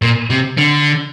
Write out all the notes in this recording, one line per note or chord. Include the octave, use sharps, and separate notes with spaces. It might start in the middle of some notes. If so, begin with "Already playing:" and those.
A#2
C3
D3